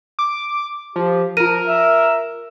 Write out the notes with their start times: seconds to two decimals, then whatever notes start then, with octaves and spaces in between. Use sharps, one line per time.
0.19 D6
0.96 F3 G4
1.37 F3 F4 A#4 D#7
1.66 E5